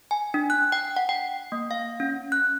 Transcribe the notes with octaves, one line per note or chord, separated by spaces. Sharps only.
G#5
D4
F#6
G5
F#5
G5
A#3
F5
C#4
F#6